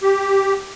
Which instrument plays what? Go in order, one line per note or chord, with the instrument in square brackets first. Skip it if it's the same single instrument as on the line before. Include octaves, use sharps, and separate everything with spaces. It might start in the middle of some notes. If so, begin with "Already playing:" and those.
[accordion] G4